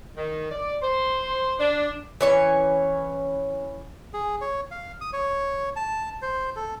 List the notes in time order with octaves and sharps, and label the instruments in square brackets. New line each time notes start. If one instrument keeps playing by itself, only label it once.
[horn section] D#3
D5
C5
D4
[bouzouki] E3 C#4 C#5
[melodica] G#4
C#5
F5
D#6
C#5
A5
C5
A4